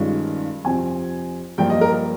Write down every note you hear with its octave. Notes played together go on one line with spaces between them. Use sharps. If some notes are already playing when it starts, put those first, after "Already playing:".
Already playing: G2 D#3 G#3 C#4 F4
F2 C3 F3 C4 G#5
G2 F3 A#3 F4 G5
D#5
A#4